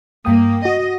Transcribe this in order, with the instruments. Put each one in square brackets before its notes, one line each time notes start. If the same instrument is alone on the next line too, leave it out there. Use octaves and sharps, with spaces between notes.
[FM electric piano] G2 G5 D#6 [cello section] A#3
[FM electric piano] F#4 [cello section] D#5